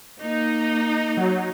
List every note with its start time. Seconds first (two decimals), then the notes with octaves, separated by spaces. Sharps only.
0.21 A#3 D#4
1.17 F#3